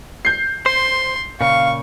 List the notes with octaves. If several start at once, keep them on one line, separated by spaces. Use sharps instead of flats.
G6 C7
C5 C6
A#2 C#3 F5 C#6